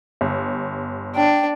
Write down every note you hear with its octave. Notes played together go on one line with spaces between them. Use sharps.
G1
D4 G5